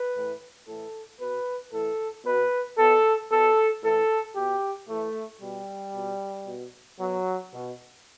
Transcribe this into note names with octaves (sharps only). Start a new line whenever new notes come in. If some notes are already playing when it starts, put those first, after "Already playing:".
Already playing: B4
A2 E3
A2 E3 A4
B2 B4
A2 E3 A4
B2 B4
B2 A4
B2 A4
A2 E3 A4
B2 G4
A2 E3 A3
B2 G3
B2
B2
B2 F#3
B2